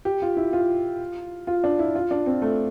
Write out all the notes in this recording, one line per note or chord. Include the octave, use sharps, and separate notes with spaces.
G4
F4
E4
F4
F4
D4
E4
F4
D4
C4
A3